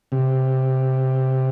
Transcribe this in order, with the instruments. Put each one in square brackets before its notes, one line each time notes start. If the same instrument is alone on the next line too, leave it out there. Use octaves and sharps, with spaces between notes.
[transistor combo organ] C3